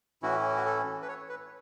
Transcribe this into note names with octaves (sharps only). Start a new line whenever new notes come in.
A2 E3 C#4 E4 F#4
F#4
A4
B4
C#5
B4